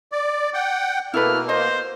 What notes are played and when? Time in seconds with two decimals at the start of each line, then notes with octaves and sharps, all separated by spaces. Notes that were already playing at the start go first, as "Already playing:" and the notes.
0.12 D5
0.54 F#5 G5
1.14 B2 A#3 E4 A4 B4 F6
1.49 C5 D#5